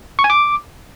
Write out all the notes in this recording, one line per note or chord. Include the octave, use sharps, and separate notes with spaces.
C#6
G#5
D6